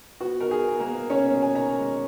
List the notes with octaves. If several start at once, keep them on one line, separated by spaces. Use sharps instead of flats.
B3 F#4
D#4 A#4
G#4
B3
A#3 A#4
B3
B2 C#4 C#5
B2
G#5
D#4 A#4 A#5
G#3